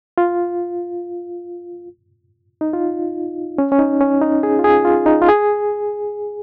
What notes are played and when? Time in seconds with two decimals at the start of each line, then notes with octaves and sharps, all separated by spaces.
0.18 F4
2.61 D#4
2.73 F4
3.58 C#4
3.72 C#4
3.79 D#4
4.01 C#4
4.21 D#4
4.43 G#4
4.59 F4
4.64 G#4
4.85 F4
5.06 D#4
5.22 F4
5.29 G#4